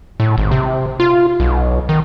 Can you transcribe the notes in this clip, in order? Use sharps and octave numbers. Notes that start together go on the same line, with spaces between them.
A2
G#1
C3
F4
B1
D#3